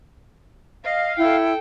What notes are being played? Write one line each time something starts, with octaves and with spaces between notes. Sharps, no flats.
D#5 F5
E4 A4 G5